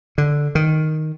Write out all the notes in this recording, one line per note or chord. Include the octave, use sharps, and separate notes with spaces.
D3
D#3